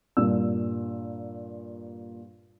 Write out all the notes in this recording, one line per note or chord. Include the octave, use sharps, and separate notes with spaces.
G2 A#2 E6